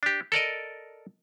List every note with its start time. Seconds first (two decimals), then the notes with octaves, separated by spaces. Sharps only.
0.03 D4 G4
0.32 A4 A#4 D5 D#5